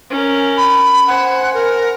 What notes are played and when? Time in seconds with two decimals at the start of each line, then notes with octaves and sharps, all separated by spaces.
0.11 C#4 A#4
0.57 B5
1.07 C5 F#5 G#5
1.54 A#4